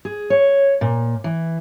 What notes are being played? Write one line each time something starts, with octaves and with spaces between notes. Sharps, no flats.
G#4
C#5
A#2
E3